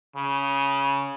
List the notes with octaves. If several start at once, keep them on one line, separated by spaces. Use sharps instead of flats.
C#3